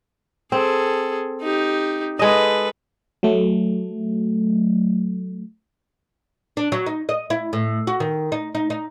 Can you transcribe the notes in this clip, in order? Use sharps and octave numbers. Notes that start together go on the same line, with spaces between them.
C4 G#4 A4
D#4 G4
G#3 A4 B4 D#5
F#3 A3
D4
F#3
D#4
D#5
E4
A2
F#4
D#3
D#4
D#4
D#4